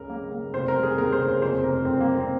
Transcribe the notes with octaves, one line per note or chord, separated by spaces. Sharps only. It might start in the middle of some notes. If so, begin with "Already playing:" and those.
Already playing: C#2 C#3 A#4
A#3
A#3
F1 C5
A#4
G3
G#4
D#2 A#4
C5
C#3
F2 C5
F1 A#4
F2 C4
A#3
F2
C4